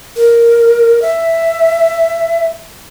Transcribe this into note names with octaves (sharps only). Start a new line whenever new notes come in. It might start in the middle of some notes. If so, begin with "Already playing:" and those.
A#4
E5